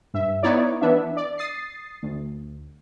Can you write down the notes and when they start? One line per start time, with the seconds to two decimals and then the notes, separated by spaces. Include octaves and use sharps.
0.14 G2 E5
0.43 B3 D#4 E4 C#5 D5
0.81 E3 B3 D4 E5
1.17 D5
1.38 D#6 A6 C7
2.02 D2